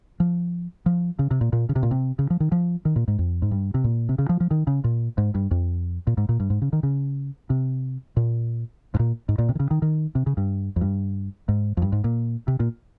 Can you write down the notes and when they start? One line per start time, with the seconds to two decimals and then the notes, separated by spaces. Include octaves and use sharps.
0.20 F3
0.86 F3
1.19 C#3
1.31 C3
1.41 A#2
1.53 A#2
1.69 C#3
1.76 C3
1.83 A#2
1.91 C3
2.19 C#3
2.30 F3
2.40 D#3
2.52 F3
2.85 D#3
2.96 A#2
3.08 G#2
3.19 F2
3.42 G#2
3.51 G2
3.74 C3
3.84 A#2
4.09 C3
4.18 C#3
4.29 F3
4.40 F3
4.51 D#3
4.67 C#3
4.84 A#2
5.18 G#2
5.35 G2
5.51 F2
6.07 A#2
6.17 G#2
6.29 A#2
6.40 G2
6.50 G#2
6.62 C#3
6.73 D#3
6.83 C#3
7.50 C3
8.17 A#2
8.94 G#2
8.99 A#2
9.29 G#2
9.38 A#2
9.49 C3
9.55 D#3
9.60 C#3
9.71 D#3
9.82 D#3
10.15 C3
10.26 C#3
10.37 G2
10.76 F2
10.81 G2
11.49 G#2
11.77 F2
11.82 G2
11.92 G#2
12.04 A#2
12.48 C3
12.60 A#2